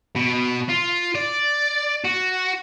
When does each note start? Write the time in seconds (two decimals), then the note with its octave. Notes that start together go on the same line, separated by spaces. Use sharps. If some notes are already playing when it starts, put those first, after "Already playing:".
0.15 B2
0.69 F4
1.15 D5
2.04 F#4